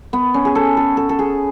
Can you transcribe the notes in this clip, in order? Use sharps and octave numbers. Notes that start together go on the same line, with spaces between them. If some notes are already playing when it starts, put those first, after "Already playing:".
B3
C#4
G#4
A4
A4
A4
A4
G#4